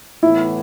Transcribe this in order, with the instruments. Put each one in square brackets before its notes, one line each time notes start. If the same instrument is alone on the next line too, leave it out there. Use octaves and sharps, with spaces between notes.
[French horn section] A2 E3 B3 [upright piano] E4